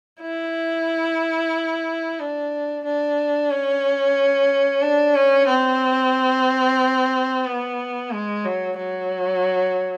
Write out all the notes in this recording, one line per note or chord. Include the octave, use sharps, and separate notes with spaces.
E4
D4
D4
C#4
D4
C#4
C4
B3
G#3
F#3
F#3